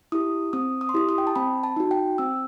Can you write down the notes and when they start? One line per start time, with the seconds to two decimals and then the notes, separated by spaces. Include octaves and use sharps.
0.12 E4 G4 D#6
0.53 C4 D#6
0.81 D#6
0.89 C6
0.94 E4 G4 D#6
1.09 D#6
1.18 G5
1.27 A5
1.36 C4 B5
1.64 A5
1.76 D#4 F#4
1.91 G5
2.18 C4 E6